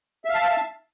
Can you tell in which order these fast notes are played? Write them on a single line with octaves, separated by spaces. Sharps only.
E5 F5 A5